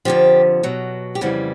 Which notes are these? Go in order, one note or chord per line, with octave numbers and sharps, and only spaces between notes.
F2 D3 F3 G4
B2 F#3
G4
F2 C#3 E3 G3 F#4